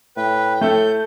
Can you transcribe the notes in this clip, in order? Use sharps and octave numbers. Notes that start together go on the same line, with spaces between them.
A2 B4 G5
A2 A3 A4 G6